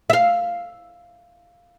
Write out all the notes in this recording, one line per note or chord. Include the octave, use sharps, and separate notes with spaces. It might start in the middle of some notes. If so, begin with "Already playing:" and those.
E5 F5